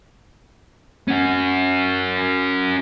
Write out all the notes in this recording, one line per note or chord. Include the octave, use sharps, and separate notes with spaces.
C#4 F#4